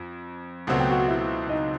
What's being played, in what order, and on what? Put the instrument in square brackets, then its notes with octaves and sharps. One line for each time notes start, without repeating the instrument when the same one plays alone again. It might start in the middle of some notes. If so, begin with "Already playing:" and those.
Already playing: [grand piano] F2
[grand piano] C#2 B2 F#3 A3 C4 [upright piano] F#5
[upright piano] G5
F#4 F#5
E4 E5
D#4 D#5